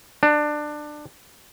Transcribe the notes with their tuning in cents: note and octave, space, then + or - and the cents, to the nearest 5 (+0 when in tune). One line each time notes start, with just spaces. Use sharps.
D4 +20